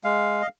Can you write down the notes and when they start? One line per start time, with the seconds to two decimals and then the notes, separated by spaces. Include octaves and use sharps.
0.04 G#3 F5
0.42 D#5